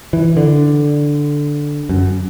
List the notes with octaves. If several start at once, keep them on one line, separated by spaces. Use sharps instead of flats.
E3
D3
F#2